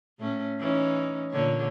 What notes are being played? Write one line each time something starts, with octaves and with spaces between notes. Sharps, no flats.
A2 A3 C#4
E3 C#4 D#4
A#2 D3 C#5